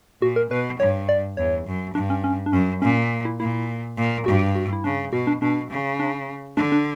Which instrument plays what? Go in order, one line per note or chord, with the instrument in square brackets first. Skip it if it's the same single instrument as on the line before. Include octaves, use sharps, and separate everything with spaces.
[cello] A#2 [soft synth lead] F#4
[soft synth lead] A#4
[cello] B2 [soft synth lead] B4
[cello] G2 [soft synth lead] C#5
[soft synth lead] D5
[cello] E2 [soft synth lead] C#5
[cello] F#2
[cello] G2 [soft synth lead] D4
[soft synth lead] C#4
C#4
D4
[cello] F#2 [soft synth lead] C#4
[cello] A#2 [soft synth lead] C#4
[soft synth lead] E4
[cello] A#2 [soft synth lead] E4
[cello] A#2
[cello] G2 [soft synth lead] F#4
[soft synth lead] F#4
E4
[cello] C#3 [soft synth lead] D4
[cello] B2 [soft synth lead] F#4
[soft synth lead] D4
[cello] B2 [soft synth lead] D4
[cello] C#3
[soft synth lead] D4
[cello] D3 [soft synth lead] D4
[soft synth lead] D4